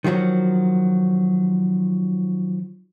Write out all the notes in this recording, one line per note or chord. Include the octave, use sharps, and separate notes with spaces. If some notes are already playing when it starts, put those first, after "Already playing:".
D#3 F3 F#3 F#4